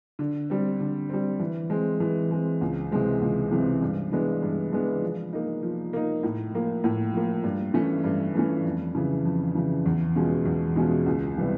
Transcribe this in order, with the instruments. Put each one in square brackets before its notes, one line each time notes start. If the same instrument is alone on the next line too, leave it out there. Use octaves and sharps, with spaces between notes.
[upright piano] D3
G3 C4
D3
G3 C4
E3
G#3 C4
E3
G#3 C4
C#2
C3 E3 G#3 C4
C#2
C3 E3 G#3 C4
G2
E3 G#3 B3 D4
G2
E3 G#3 B3 D4
F3
A#3 D#4
F3
A#3 D#4
A2
F3 A#3
A2
F3 A#3
G2
E3 A3 C#4
G2
E3 A3 C#4
F2
C#3 E3
F2
C#3 E3
E2
B2 G#3 C#4 F4
E2
B2 G#3 C#4 F4
C#2
C3 E3 G3 B3